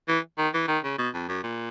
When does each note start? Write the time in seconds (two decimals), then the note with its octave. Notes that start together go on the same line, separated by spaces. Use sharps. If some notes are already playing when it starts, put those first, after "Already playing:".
0.08 E3
0.38 D#3
0.54 E3
0.68 D#3
0.84 C#3
0.98 B2
1.14 F2
1.28 F#2
1.43 A#2